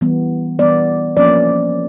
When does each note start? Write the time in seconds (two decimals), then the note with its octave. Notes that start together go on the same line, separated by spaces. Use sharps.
0.01 E3 G3 B3
0.59 E3 G3 B3 D5
1.17 F3 A#3 C#4 D5